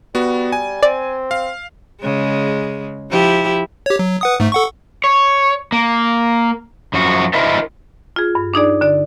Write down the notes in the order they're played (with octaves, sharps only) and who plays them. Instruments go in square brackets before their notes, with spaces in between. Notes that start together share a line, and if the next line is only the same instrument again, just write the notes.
[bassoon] G3 [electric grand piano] B3 F#4
[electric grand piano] G#5
[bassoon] C4 [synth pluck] D5
[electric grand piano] F5
[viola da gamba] C#3 G#3
F3 E4 G4
[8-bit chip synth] G4 C#5
F#3
B4 F#5 D#6
G#2 A3
A4 F#5 C#6
[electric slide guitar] C#5
A#3
F#2 F3 F#4
D4 E4 A#4 C5 D#5 E5
[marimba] F4 G#4
G2
D4 D#4 G#4 D5
D3 D5